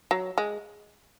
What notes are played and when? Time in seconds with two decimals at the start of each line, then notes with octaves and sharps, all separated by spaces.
0.11 F#3
0.38 G#3